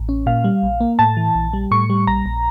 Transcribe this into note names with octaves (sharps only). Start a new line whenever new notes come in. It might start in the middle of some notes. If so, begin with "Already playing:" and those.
Already playing: A1
C#4
A#2 F5
G3
A#1
A#3
A2 A5
E3
A#1
G3
A2 C#6
G3
A#1 A#5
A#1